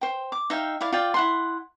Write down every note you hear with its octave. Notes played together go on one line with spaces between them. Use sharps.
C5 G5
D6
D#4 E5 F5 G5
E4 D5 F5
F4 D5 G5
E4 F#5 C6